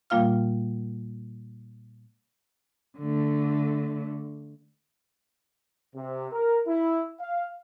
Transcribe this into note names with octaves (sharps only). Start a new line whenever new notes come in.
A#2 G3 A#3 F4 F5 F6
D3 A3
C3
A#4
E4
F5